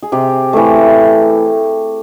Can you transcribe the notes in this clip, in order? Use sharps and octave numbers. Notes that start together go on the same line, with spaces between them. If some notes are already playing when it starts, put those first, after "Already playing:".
G#4
C3 G4
E3 A3